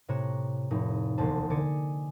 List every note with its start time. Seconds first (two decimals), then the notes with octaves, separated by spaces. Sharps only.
0.08 A2 C3 C#5 A#5 F#6 E7
0.71 F1 A2 D#4
1.18 E1 D2 A#3 D#4 C5 A5
1.50 D3 D5 D#5 G#5 C#7